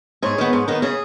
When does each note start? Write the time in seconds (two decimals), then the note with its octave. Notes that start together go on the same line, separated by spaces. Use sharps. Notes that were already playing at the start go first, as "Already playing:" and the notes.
0.22 G#2 G#4 C#5
0.38 D#3 B3
0.53 G#2
0.68 D#3 B3
0.82 C#3 G#4